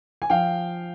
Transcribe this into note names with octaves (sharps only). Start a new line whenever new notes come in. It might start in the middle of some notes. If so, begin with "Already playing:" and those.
G#5
F3 F5 G5